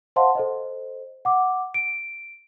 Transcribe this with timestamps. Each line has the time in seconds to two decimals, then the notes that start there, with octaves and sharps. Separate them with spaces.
0.16 C5 D#5 F5 F#5 A5 C6
0.35 A4 C5 D#5
1.25 F#5 D6
1.74 D7